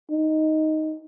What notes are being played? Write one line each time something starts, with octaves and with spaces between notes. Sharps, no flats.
D#4